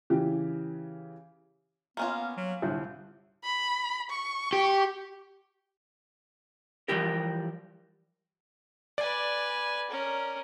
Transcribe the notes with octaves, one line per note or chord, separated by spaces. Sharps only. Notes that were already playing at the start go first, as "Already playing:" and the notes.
C#3 E3 G4
A#3 B3 C#4 F4
F#3
G1 C2 A2
B5
C#6
G4
E3 F3 G3 G4 A#4
B4 D5 G#5
C#4 A#4